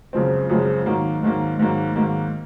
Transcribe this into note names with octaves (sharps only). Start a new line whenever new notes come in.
F#2 C#3 F3 G#3 C4
F#2 C#3 F3 G#3 C4
G#2 D#3 F#3 A#3
G#2 D#3 F#3 A#3
G#2 D#3 F#3 A#3
G#2 D#3 F#3 A#3